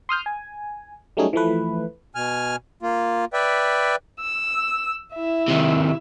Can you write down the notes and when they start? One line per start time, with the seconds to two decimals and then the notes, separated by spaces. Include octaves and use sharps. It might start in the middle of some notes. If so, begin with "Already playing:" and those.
0.09 C6 D#6 F6 G6
0.26 G#5
1.17 F#3 G3 A3 C#4 D#4 G#4
1.33 E3 F3 A3 B4
2.15 B2 G#5 F6
2.82 A#3 F4
3.33 B4 D5 E5 G5
4.20 E6
5.12 E4 E5
5.48 C3 D#3